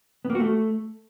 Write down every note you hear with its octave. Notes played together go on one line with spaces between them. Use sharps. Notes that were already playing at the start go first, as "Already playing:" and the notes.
B3
A#3
F#4
A3